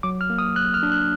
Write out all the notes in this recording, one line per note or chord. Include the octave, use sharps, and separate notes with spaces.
F#3 D6
F6
A#3
D#6
F#3 F#6
F6
D4
F#6